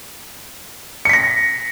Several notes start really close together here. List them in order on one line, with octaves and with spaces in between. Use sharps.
C#7 B6 A#6